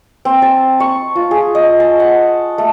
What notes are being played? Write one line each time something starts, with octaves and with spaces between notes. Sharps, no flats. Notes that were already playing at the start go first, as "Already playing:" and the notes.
C4
A5
C#6
F4
G#4
D#5
A5
F#5
A3